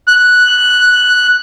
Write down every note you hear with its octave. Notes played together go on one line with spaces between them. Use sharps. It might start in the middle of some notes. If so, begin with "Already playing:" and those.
F#6